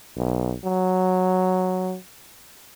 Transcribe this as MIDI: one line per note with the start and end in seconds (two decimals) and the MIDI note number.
0.17 0.54 35
0.64 1.96 54